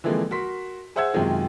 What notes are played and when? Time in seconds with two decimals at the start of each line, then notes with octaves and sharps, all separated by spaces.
0.04 D3 E3 F3 G#3 A#3 C4
0.31 F#4 A#4 C6 B6
0.96 G#4 C5 E5 F#5 E6 G#6
1.13 F#2 C3 D#3 G#3 F4 F#4